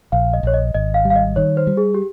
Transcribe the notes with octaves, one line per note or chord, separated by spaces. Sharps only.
A#1 F5
D#5
A#1 C#5
D#5
G#1 D#5
F5
G3
F5
D#5
D#3 C#5
C5
G3
G#4
G4